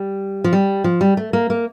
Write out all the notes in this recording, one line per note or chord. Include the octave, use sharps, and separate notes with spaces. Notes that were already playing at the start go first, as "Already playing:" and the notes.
Already playing: G3
F3
G3
F3
G3
A3
A#3
A#3